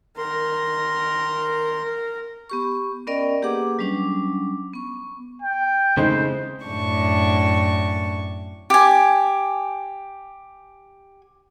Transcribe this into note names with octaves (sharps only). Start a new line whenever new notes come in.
D#3 A#4 C6
B3 G4 C#6
B3 C#4 A#4 D5 D#5 G5
A#3 G4 G#4 B4 F#5 D6
F#3 G3 C#4 D4 D6
B3 C#6
G5
C#3 G#3 A3 C4 D#4 E4 C5
F#2 A2 D4 C#6
G4 G#5